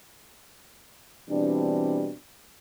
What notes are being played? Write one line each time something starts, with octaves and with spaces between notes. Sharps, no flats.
B2 E3 G3 C4 D4